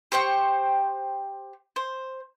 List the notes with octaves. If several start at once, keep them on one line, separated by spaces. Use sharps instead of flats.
G4 C5 G5 C#6
C5